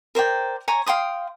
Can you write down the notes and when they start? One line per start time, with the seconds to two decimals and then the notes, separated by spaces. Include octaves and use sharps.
0.15 A#4 C5 D5 G5
0.68 C#5 G#5 A#5
0.86 F5 G5 C6 D#6